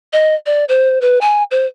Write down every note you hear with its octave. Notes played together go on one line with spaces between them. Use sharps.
D#5
D5
C5
B4
G#5
C5